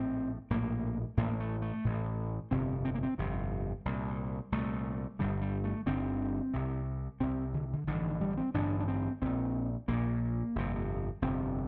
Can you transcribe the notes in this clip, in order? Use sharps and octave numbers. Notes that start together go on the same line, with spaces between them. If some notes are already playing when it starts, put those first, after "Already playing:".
Already playing: A#1 A2 C4
A#1 A2 A#3
A1 A2 A#3
A3
A3
A1 A2
G1 F2 C3 C4
C4
A#3
C4
G1 F2 C3
C2 A#2
C2 A#2 A3
G1 G2 D3 G3
G3
A3
G1 G2 D3 C4
C2 C3
C2 C3 C4
D3
D3
A1 G2 D3 D#3
D#3
G3
C4
A1 G2 D3 D4
D4
C4
A#1 A#2 C4
A#1 A#2 A#3
G1 F2 C3
G1 F2 C3 C4